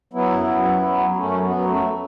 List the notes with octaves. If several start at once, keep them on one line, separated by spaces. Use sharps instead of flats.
F#3 B3 E4
F#2
F#2
F#3
F#3
F#2
F#2 A3 C#4
F#3
B3
F#3
F#2 A3